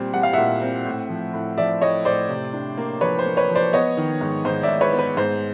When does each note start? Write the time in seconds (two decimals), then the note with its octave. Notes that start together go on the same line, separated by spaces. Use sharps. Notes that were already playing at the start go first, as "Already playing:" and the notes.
Already playing: A#2 G3 C4
0.14 G3 F#5
0.23 F5
0.33 A#2 E5 F#5
0.62 C4
0.85 A2
1.09 F3
1.34 A2
1.58 F3 D5 E5
1.82 A2 C#5 D#5
2.05 A2 C5 D5
2.29 C3
2.53 D4
2.77 A#3
3.01 F3 B4 C#5
3.19 C5
3.25 A#3
3.37 B4 C#5
3.49 F3
3.55 C5 D5
3.73 B3 C#5 D#5
3.97 D#3
4.21 G#2
4.45 G#2 C5
4.63 D5 E5
4.69 G#2
4.81 B4 C#5
4.93 B3
4.99 B4
5.17 G#2 C5